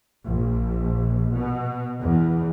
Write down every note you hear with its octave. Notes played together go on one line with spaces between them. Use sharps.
A#1
B2
E2